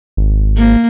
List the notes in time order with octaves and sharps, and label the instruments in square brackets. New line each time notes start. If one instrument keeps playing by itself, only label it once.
[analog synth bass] G#1
[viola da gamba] A#3